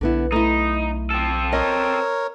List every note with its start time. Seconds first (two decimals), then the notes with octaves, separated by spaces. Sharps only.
0.01 B1 D3 B3 E4
0.32 A3 D#4 E4
1.10 C4 A4
1.53 A#4 C#5 D#5